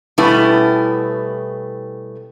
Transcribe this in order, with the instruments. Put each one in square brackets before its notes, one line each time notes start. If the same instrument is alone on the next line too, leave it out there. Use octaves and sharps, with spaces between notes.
[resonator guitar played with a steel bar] B2 G3 A3 B3 C#4 E4